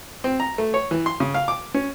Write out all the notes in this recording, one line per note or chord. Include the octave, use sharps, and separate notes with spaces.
C4
A#5
A3
C#5
E3
C6
C#3
F5
D6
C#4